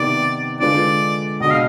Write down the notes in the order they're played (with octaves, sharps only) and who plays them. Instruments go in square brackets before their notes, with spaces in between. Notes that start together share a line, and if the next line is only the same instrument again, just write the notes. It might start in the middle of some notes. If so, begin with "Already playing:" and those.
Already playing: [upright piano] C3 D#3 B3 [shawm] D5
[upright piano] D3 G#3 D4 F4 B4 [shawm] D5
[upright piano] B2 G#3 D4 [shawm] D#5
[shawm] F5